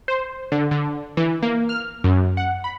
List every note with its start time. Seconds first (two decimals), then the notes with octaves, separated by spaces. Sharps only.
0.08 C5
0.52 D3
0.71 D3
1.17 E3
1.43 A#3
1.69 F6
2.04 F#2
2.37 F#5
2.64 B5